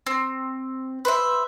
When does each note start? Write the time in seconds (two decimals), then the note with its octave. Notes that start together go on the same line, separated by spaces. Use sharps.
0.06 C4
1.05 B4 C5 E5